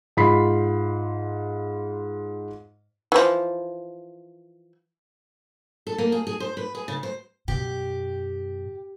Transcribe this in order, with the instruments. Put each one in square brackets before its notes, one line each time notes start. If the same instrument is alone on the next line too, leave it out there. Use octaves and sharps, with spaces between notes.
[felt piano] G#2 F4 B5 B6 C7
[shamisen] E3 F3
[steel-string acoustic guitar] A4
A#3
G#4
G#4
C5
B4
G#4
C#3
C5
[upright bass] F#2 B2 [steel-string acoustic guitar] G4